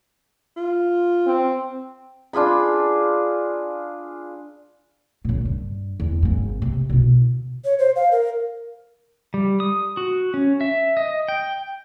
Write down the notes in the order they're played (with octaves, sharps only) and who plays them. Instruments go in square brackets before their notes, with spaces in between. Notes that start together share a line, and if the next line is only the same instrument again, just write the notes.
[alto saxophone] F4
[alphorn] C4
[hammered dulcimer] D4 F4 G#4 B5
[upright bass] A#2 C#3
G2
E2
G#1 G#2
C3
B2 E4
[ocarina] C#5
C5
F5
A#4
[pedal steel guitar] G3
D#6
F#4
C#4
E5
D#5
G5